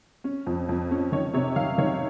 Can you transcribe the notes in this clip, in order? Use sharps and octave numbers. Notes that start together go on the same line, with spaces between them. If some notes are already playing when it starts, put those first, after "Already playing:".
C#4
F2
F2
C#4
D#3 C#5
C3 C#5
D#3 F5
D#3 C#5